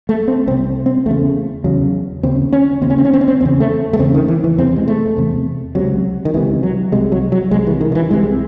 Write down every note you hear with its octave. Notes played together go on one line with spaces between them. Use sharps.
A3
C4
C2 C3 C4
C4
E2 C#3 A3
E2 C#3 F#3
D#2 C#3 C4
C#4
D#2 C#3 C4
C#4
C4
C#4
C4
C#4
C4
E2 C#3 C4
A3
A3
E2 C#3 C4
D#3
E3
E3
E2 C3 C4
G#3
A3
E2 C3
C#2 C3 F#3
D#3
C#2 C3 E3
F#3
C2 C3 G#3
F#3
F#3
C2 C3 G#3
E3
D#3
D#3
E3
C2 C3 G#3